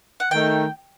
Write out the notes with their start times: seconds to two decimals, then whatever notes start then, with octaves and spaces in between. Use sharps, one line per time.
0.20 F#5
0.31 D#3 A3 D#4 G5